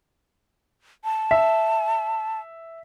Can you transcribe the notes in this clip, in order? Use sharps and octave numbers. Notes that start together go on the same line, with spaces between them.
A5
E5